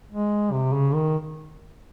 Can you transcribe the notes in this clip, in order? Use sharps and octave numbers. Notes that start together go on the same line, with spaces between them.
G#3
C3
C#3
D#3